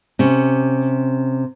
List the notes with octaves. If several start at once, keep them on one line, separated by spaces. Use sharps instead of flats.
C3 C#4